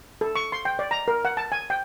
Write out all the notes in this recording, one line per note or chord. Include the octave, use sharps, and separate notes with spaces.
A4
C#6
C6
G5
D5
A#5
A#4
F#5
A5
G#5
G5